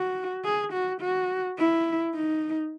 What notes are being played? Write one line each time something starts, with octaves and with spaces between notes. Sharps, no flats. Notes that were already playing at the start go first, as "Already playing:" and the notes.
Already playing: F#4
G#4
F#4
F#4
E4
D#4